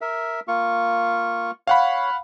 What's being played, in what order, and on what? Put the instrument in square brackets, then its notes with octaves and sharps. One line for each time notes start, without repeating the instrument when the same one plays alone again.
[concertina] A#4 E5
A#3 F4 C#6
[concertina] C#5 [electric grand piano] F5 F#5 B5